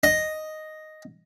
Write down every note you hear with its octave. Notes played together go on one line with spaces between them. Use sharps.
D#5